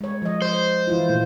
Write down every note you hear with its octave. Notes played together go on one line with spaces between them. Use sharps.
G#3 C#5
F3 D#5
C5
E3 E4 F4
A#2 A3 F4